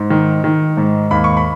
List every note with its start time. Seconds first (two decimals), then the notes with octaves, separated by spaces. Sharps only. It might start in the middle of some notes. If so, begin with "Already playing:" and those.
Already playing: G#2
0.10 D#3
0.44 D#3
0.77 G#2
1.11 D#2 B5
1.24 C#6
1.37 B5